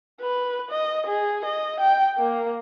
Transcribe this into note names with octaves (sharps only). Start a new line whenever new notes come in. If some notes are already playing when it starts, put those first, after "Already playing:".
B4
D#5
G#4
D#5
G5
A#3